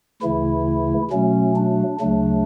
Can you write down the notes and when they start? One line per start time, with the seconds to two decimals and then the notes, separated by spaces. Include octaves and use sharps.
0.22 D2 C#3 E3 A3 E4
1.11 B2 F#3 A3 C#4
1.56 D4
2.00 D2 C#3 F#3 A3 D4